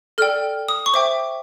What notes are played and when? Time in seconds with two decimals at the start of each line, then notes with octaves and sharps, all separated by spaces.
0.18 A4 D5 G5 F6
0.69 D#6
0.86 C#6
0.94 C5 E5 G5 D6